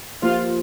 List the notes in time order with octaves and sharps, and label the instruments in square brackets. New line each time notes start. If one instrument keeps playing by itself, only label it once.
[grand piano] F3 A#3 G4 C5 [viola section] F4